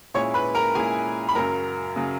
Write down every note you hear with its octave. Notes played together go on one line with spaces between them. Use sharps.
A#2 G#3 C#4 E4 C#5 C#6
B4 B5
A#4 A#5
A#2 G#3 C#4 E4 G#4 G#5
B5
F#2 C#3 F#3 A#4 A#5
C#3 F#3